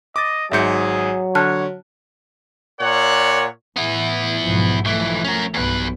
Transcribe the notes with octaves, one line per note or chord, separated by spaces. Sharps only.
D#5 D6 A6
G#1 G#2 F#3 G#4 E5 G6 C#7
D3 C#5 A5 F6 F#6
A#2 A#4 C#5 D5 F#5
A2 E3 B3 E4
B1 G#2 F3
B1 E3 F3 A3
C#4 A#4
B1 E2 G2 B3 B4